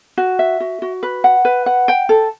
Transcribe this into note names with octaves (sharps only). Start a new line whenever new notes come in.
F#4
E5
F#4
F#4
B4
F#5
B4
F#5
G5
A4